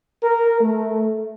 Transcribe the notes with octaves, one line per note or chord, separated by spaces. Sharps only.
A#4
A3